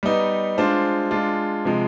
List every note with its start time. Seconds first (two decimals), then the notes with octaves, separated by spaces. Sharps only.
0.03 G3 B3 D#4
0.58 G#3 D4 F4 C5
1.11 G#3 D4 F4
1.65 C3 F3 G#3